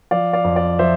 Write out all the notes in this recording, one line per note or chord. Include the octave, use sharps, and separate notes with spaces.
F3 D5 F5
D5 F5
F2
D5 F5
F3 C5 E5